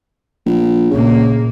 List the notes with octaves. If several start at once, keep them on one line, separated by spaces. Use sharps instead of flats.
A#1
A#1 C#3 A#3